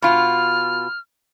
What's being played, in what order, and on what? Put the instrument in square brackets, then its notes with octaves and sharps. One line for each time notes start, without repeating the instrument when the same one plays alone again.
[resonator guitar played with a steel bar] B2 F4 [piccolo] F6